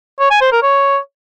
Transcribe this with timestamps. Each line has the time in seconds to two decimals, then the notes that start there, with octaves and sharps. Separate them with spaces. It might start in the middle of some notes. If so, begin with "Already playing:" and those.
0.19 C#5
0.30 G#5
0.41 C5
0.52 A#4
0.63 C#5